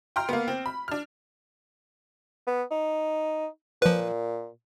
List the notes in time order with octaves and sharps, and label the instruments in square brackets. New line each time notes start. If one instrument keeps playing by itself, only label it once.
[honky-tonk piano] G5 A#5 C6 F6
A#3 B3
C4
B5
D4 F6
[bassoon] B3
D#4
[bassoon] A#2 [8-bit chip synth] F3 B4